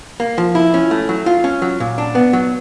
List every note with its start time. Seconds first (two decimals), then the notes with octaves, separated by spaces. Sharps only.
0.20 A#3
0.38 F3
0.55 E4
0.74 C#4
0.91 A3
1.09 F#3
1.26 F4
1.44 C#4
1.62 F#3
1.80 A#2
1.98 D4
2.15 B3
2.33 F#3